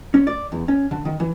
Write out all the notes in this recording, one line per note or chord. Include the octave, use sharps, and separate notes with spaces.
C#4
D5
E2
C#4
D3
D#3
E3